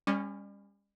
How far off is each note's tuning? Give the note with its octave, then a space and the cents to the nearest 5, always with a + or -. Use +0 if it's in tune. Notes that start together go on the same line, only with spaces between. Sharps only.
G3 +40 C#4 +0